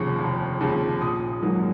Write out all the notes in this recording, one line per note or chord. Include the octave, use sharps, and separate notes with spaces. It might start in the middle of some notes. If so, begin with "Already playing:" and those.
Already playing: F1 D#2 C#3 F3 C#6
F1
D#2 C#3 F3
A#1 D#6
G#2 D#3 F#3 A#3